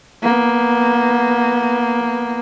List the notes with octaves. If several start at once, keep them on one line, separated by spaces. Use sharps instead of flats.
A#3 B3